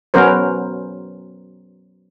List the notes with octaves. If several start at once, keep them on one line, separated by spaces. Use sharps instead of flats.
F#3 B3 C#4 A#4 C5